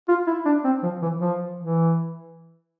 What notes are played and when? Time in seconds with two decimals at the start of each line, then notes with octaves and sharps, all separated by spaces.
0.08 F4
0.27 E4
0.46 D4
0.64 C4
0.83 F3
1.02 E3
1.21 F3
1.60 E3